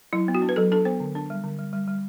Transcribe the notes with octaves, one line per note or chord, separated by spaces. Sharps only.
F#3 E4
B3
F#4
D4
B4
F#3 A4
D4 A4
B3 C5
D3
D4
G3
D3
G3
G3
G3